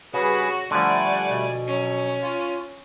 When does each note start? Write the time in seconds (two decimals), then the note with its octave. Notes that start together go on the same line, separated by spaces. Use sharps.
0.14 G2 C#3 F#4 G#4 B4
0.71 D3 F3 G3 A3 D5 F#5 G#5
1.30 B2
1.68 F#3 C#4
2.21 F4